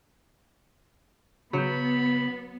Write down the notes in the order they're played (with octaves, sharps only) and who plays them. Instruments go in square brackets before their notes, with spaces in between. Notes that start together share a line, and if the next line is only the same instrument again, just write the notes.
[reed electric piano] C#3 G6 [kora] F#3 [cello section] B3 [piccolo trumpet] B5